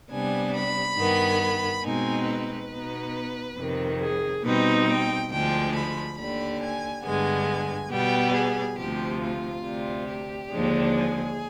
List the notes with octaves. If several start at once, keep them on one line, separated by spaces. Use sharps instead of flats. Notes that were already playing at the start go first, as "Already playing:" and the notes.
C3 G3 B3 D4 G#5
B5
G2 D#3 B3
B2 G#3 C4 D#4 G#5
B4
B2 B3 D#4
F2 C3 D#3
G#4
B2 G3 C4 D#4 B4
G5
D2 D3 F3 G#3 G5
B5
D#2 D3 G3 B5
G#5
G2 D3 G#3 B3 G#5
B2 G3 B3 G5
G#4
D2 C3 F3 G4
F4
D2 C3 G3
G4
D#2 D3 F3 G#3 D4
G#4